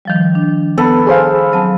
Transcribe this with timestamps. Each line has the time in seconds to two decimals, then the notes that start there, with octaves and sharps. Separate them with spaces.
0.05 D#3 F3 G3
0.35 D4
0.78 B3 A4 B4
1.07 G#4 C5 F5
1.53 F#3 C4 A5